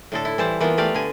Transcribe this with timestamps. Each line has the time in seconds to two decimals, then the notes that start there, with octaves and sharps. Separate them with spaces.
0.12 A2 D3 A4
0.25 E4
0.38 E3 G3 C5 A5
0.61 E3 A#3 B3 F4
0.78 A3 G4 D5 F5
0.94 D3 G#5